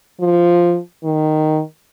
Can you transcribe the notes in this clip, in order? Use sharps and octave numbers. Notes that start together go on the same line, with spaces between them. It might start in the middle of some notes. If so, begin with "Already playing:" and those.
F3
D#3